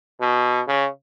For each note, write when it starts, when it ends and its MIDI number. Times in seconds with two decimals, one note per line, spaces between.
0.21 0.61 47
0.67 0.88 49